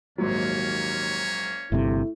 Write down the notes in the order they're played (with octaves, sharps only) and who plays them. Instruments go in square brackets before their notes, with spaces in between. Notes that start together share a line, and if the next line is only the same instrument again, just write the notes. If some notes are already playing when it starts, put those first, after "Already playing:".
[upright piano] A#1 G#2 F#3 [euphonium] D#2 [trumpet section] A#3 C#4 C#5
[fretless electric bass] G1 G2 C3 [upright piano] A3 [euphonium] E4